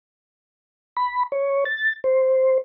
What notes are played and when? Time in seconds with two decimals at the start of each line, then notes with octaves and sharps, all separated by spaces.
0.97 B5
1.32 C#5
1.65 A6
2.04 C5